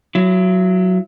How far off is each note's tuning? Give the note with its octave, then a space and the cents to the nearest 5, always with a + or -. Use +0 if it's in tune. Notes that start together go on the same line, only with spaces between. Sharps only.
F#3 +0 E4 +35